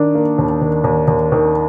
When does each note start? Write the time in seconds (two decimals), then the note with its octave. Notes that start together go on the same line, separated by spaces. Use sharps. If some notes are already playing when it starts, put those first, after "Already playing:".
Already playing: D#3 D4
0.15 A#3
0.38 D#2
0.61 D#3
0.84 D#2
1.08 D#2
1.32 D#3